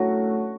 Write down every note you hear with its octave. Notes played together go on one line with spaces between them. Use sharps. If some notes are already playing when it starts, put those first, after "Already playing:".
Already playing: F#2 A2 D3 F#3 A3 F#4